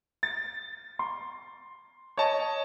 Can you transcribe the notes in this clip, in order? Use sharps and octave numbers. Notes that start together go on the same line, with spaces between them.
A6
C6
C#5 D#5 A5